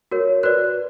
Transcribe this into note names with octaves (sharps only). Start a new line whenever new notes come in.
F#4 A#4 C#5
F#4 B4 D5 F#6